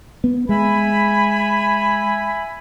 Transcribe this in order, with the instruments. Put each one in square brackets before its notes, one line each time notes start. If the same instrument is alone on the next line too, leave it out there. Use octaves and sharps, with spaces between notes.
[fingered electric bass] B3
[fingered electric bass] G#3 [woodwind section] E5 G#5 B5